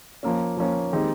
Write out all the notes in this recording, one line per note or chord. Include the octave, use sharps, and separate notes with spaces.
F3 A#3 C#4
F3 A#3 C#4
D#3 G#3 C4 D#4 G4